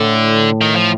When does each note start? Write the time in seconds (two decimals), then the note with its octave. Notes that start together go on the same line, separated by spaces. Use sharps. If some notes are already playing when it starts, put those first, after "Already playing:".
Already playing: A2 D3
0.61 D#3
0.76 F3